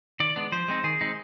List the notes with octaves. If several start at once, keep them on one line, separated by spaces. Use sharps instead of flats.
D#3 D5
G#3 B3 D4
F3 C5
G#3 C4 D#4
D#3 G#4
G#3 C4 D#4